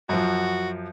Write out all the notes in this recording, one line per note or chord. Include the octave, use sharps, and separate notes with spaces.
F#2 F3 F#4